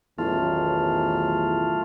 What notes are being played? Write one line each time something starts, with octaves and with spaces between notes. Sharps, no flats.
A1 E2 B2 D#3 F#3 A3 F4